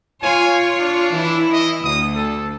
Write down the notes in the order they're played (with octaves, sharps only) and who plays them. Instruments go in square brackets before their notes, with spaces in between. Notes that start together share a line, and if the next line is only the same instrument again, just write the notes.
[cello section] F4 C#5 [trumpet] G#5
[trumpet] D4
[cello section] E3 E4
[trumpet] D#5
[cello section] D2 [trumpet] D#6
[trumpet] A4